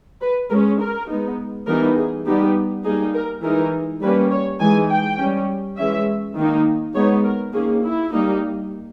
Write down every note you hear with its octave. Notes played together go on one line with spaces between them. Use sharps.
B4
G#3 C#4 A#4
A#4
G#3 B3 D#4
E3 G3 B3 D#4 A#4
G#4
G3 B3 D#4 G4
G3 A#3 D#4 G#4
A#4
E3 G#3 D#4 A#4
G3 A#3 C#4 B4
C#5
E3 G#3 D#4 G#5
G5
G3 C#4
E3 G#3 C#4 E5
D#3 A#3 D#4
G#3 B3 D#4 C#5
A#4
D#3 A#3 C#4 G#4
E4
G3 A#3 D#4